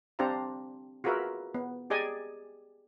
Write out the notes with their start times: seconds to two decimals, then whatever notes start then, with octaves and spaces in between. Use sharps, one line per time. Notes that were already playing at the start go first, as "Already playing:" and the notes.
0.19 C4 D4 G4 C5 F5 A#5
1.04 F4 F#4 G#4 A#4 B4 E5
1.55 B3
1.90 G4 G#4 D5 D#5 G#5